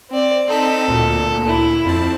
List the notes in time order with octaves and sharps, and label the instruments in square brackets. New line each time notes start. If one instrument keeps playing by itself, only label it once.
[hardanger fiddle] C4 D5
[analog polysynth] C4 D#4 B6 [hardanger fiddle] A4
[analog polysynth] D2 A#2
[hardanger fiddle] E4
[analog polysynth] F2 C4 A5